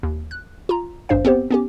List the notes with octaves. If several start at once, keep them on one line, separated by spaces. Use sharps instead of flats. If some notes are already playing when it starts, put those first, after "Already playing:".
D#2
F#6
F4 A#5
G#1 D2 G2 D4 C5 F5
B3 C4 G4 C5
B3 C#4 G4